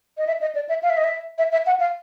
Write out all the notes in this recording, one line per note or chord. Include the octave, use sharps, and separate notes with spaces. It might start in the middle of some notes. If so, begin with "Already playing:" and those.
D#5
E5
D#5
D5
E5
F5
E5
D#5
E5
E5
E5
F#5
F5